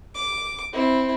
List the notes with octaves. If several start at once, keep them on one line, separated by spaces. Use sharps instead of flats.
D6
C4 E4